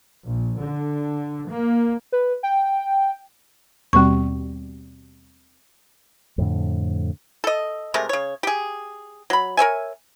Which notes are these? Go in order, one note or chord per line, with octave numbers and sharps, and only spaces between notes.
A#1
D3
A#3
B4
G5
D#2 B2 G3 C4 C#6
F2 A2 D3
A4 D#5
C3 G#3 A3 A#4
C#3 C#5
G4 G#4
F#3 B5
A#4 C#5 E5 G#5